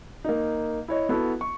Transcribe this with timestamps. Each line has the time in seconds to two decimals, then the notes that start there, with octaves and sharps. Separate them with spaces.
0.24 A#3 D#4
0.88 E4 C#5 D#5
1.09 B3 E4 F#4 A4
1.41 C#6